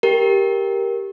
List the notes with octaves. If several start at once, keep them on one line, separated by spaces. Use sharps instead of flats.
G4 A#4